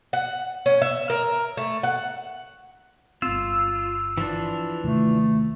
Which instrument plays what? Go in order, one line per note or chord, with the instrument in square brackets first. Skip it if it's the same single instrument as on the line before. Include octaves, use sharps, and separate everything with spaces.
[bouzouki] F#5
C#4
E5
A#4
A3
F#5
[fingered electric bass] G1 B3 C4 [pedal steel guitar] F4 [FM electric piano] E6
[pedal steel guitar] E3 F3 D4
[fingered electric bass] D#2 C3 D#3 [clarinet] A3